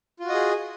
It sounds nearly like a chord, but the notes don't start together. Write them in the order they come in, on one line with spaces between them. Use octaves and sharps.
F4 F#4 D#5 G#4